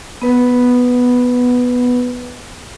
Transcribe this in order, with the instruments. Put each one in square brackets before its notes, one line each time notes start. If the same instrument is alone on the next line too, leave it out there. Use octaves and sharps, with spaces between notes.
[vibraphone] B3 B4